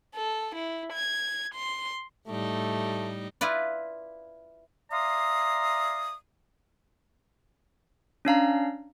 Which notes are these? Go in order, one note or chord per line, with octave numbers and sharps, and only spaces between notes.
A4
E4
G#6
C6
A2 G3 A3 D#4
E4 F4 B4 D5
D5 E5 F5 A#5 C6 D#6
C#4 D4 F5 A#5